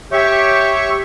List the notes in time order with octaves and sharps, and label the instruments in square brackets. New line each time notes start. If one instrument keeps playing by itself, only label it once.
[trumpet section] G4 [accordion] C#5 E5 C#6